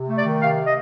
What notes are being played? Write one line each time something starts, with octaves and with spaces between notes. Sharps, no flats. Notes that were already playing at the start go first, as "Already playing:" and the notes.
Already playing: C3
A3
D5
D#3
C3 F5
D#5